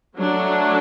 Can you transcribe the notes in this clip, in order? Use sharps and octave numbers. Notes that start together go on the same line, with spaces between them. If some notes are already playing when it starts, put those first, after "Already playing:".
F#3 A3 D4